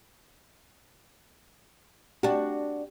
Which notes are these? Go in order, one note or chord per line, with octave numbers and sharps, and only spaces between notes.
D4 F#4 G4